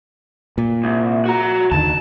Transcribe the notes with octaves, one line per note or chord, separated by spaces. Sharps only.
A#2
C2
F#4 A#5
D#2 D3 D#3 A5